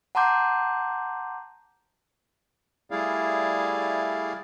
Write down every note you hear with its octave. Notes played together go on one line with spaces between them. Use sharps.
F#5 A5 A#5 C6 D6 G6
G3 A3 E4 G#4 D5 F5